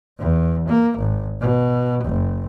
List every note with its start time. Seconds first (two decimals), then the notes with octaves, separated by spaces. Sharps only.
0.19 E2
0.68 A#3
0.98 G#1
1.41 B2
2.05 F#1